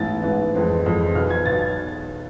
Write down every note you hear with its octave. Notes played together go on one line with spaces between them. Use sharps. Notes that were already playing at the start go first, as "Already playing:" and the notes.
Already playing: A1 G#2 E3 B3 A6
A1 G#2 E3 B3
F2 E3 G#3 C4
F2 E3 G#3 C4
B1 B2 B3 F6
G#6
B1 B2 B3 A6